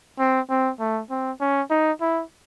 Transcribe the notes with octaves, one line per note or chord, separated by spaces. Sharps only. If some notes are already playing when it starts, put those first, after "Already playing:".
C4
C4
A3
C4
C#4
D#4
E4